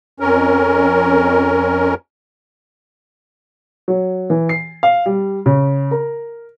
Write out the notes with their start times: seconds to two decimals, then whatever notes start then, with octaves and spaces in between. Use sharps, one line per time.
0.20 F2 C#4 A#4
3.88 F#3
4.30 E3
4.49 C7
4.83 F5
5.06 G3
5.46 C#3
5.91 A#4